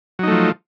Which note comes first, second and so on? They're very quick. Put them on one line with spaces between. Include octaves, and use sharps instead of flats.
F#3 D#4 A3 F3